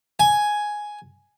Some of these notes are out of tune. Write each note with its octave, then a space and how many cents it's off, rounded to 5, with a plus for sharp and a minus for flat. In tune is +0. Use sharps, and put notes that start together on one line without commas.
G#5 +5